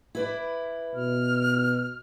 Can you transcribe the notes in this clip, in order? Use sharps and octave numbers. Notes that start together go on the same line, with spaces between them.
E4 B4 D5
B2 F6